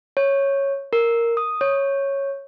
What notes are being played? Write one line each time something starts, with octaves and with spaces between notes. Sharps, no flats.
C#5
A#4
D#6
C#5